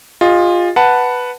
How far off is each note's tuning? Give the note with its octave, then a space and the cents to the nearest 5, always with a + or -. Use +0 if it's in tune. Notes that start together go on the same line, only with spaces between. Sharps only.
F4 +10 G#4 -45 D#5 +0
B4 +0 F#5 +0 A5 +5